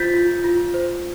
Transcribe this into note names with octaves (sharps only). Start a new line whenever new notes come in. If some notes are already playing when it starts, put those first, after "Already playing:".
Already playing: F4 C5 G6 A6 B6
F4
F4
C5